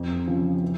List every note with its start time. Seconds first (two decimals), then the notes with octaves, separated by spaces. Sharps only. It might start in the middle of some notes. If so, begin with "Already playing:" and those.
Already playing: F2
0.27 C#3 F3
0.62 E3